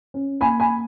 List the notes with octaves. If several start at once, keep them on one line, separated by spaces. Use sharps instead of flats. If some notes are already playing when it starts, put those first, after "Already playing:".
C#4
A#3 G#5 B5
G#5 B5